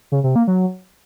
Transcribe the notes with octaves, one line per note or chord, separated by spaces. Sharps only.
C#3
C3
A#3
F#3